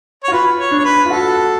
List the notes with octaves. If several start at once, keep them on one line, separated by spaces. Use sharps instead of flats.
C#5
F#4
F4 B4
C#5
D4
C#5
B4
F4
F#4 A4